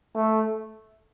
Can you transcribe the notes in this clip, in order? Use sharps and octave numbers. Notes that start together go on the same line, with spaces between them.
A3